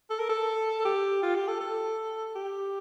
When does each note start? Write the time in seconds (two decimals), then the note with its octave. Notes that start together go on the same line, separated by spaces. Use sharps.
0.10 A4
0.19 A#4
0.29 A4
0.85 G4
1.23 F4
1.35 G4
1.48 A4
1.61 A4
2.36 G4